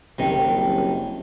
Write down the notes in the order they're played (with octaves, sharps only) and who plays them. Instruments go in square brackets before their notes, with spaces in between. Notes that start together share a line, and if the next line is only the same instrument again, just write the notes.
[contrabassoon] F#1 [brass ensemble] C2 F#2 [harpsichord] C3 D#3